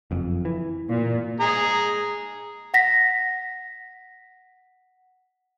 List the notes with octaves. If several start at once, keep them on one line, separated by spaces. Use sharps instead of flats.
F#1 F2
E3
A#2
G#4 A#5
F#5 A#6 B6